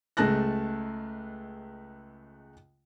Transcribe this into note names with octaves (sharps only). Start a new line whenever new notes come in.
C#2 G#3 A3 A5 F#6 A#6